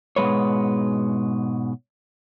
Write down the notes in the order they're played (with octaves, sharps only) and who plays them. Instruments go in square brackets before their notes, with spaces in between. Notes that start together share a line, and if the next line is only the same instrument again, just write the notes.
[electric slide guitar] G#2 B2 F3 G#3 B4 C#5